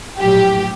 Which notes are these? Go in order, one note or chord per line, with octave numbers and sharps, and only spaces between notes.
A#1 A2 F#3 G4